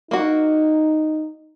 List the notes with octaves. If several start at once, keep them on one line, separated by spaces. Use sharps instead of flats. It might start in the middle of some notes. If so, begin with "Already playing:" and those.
A#3 D#4 F#4